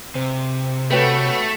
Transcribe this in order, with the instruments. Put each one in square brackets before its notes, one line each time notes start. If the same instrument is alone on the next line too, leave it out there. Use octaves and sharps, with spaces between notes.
[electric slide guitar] C3 [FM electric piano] C5
[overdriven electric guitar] A3 [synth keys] F#4 G5 B5 [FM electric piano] A4 B4 C#5